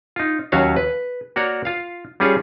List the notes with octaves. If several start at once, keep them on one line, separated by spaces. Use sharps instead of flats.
D#4 F4
D#2 F#3 C#4 F#4 C#5 F5
B4
A#3 F#4 C#5 D5 A#5
F4 F5
G3 C#4 F4 G#4 C#5